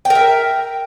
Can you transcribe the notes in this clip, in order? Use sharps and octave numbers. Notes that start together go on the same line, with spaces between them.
A#4 E5 G5